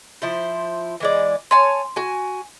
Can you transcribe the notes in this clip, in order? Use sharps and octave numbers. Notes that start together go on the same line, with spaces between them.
F3 E4 C5
E3 G#3 D5
C#5 G#5 A5 C6
F#4 G#5